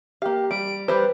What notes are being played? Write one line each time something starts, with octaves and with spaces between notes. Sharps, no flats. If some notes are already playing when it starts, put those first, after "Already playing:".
A#3 G4 F5
G3 D7
G3 G4 B4 C5